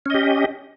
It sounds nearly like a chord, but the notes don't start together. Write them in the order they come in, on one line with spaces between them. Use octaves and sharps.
C#4 D#5 G4